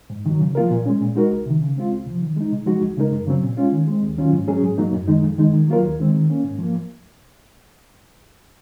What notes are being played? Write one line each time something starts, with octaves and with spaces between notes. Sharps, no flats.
G#2
D#3 F#3
C#3
F3 A#3 F4 A#4
A#2
G#3 C#4
A#2
G#3 D#4 F#4 A#4
C2
C3 D#3
C#3
G#3 C4 F4
C#2
C3 F3
D#3
G#3 D#4
C3
F3 G#3 D#4 F#4
C#2
C#3 G#3 D#4 A#4
F#2
C#3 F#3 C4
A#2
G#3 C#4 F4
D#3
G#3 C4
D#2
D#3 F#3 C#4 F4
G#2
F#3 C#4 G#4
G#2
F#3 A#3 D#4
F#2
D#3 G#3 D#4
F2
D#3 G#3 D#4
D#3
F#3 A#3 F4 A#4
D#2
D#3 G#3 C4
D#3
A#3 C#4
G#2
F3 A#3